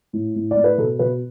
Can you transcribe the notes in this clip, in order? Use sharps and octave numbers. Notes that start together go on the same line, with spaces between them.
A2
A2
D5
A2
B4
B2 A4
B2 B4